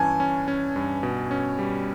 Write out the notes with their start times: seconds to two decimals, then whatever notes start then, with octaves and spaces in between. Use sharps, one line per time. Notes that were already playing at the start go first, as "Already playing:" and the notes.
Already playing: G2 E3 C#4 G#5 A5
0.20 C#4
0.48 C#4
0.76 G2
1.03 B2
1.31 C#4
1.59 G3